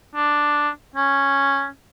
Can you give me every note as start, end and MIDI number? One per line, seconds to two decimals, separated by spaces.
0.15 0.69 62
0.96 1.67 61